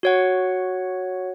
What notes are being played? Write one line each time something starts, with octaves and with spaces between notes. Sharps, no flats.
F#4 C#5 F#5